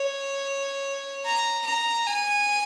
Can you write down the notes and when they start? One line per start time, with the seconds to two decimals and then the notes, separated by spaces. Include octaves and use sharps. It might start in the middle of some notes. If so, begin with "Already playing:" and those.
Already playing: C#5
1.25 A#5
1.66 A#5
2.07 G#5